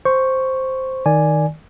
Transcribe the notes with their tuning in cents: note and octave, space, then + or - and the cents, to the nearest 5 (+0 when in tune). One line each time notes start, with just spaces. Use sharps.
C5 +0 C#6 +0
D#3 +0 D5 +0 G#5 +0